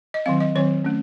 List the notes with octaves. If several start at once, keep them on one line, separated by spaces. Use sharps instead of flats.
D#5
D#3 F#3 C4 F5
D#5
D#3 F#3 C4 C#5
A3 C#4